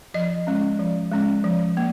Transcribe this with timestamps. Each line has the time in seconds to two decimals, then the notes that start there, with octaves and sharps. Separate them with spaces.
0.14 F3 D#5
0.47 G#3 C#4
0.79 F3
1.12 G#3 C#4
1.44 F3
1.77 A#3